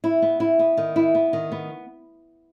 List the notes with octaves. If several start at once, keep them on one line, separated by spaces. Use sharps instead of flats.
E4
B3
E4
B3
D#3
E4
B3
D#3
B3